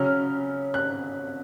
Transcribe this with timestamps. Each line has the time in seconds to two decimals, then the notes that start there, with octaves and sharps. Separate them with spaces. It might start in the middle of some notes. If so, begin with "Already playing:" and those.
Already playing: C#3 F#3 C#4 F6
0.74 F#6